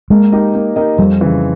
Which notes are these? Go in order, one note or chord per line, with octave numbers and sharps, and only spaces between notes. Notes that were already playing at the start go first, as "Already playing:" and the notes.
G#3 A#3
D#4 G4 A#4 D#5
A#3
D#4 G4 A#4 D#5
F2 G3
C#3 E3